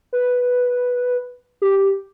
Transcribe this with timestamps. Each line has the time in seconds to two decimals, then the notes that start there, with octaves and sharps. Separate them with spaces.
0.13 B4
1.62 G4